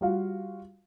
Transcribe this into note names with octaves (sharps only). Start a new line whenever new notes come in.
G3 F4 F#4 F5